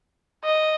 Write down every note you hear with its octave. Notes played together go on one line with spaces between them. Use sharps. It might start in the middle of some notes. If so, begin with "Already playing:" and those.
D#5